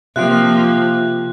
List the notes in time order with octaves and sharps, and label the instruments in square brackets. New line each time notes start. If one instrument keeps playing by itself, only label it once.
[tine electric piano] C3 F4 G5 [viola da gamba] F3 A#3 [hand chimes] E5 [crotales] F#6